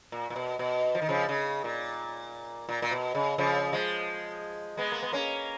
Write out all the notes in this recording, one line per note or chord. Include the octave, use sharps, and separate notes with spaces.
A#2
A#2
B2
B2
F3
D#3
C#3 F3
C#3
A#2
A#2
A#2
B2
C#3
C#3 F3
F3 G#3
G#3 B3
A#3
B3
A#3 C#4